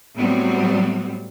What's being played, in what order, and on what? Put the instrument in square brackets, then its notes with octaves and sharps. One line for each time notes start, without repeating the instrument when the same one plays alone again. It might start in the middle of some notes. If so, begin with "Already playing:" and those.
[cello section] A2 F#3 G3 B3 C4